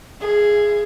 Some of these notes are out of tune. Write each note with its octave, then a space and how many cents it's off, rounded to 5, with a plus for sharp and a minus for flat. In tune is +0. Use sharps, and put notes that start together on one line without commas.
G#4 +0 E5 +40